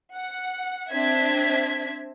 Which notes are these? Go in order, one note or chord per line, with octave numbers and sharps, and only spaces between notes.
F#5
C4 D4 E5 G#6 B6